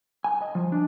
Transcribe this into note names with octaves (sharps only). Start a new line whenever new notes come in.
G#5
D#5
F3
D4